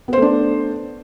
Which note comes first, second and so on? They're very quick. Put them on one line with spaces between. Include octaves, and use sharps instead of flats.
B3 C5 A3 D4